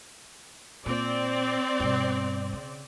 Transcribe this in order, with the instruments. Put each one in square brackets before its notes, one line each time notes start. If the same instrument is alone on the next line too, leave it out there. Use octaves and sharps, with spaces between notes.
[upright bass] A#2 [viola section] C4 D5
[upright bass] G2 B2
C#3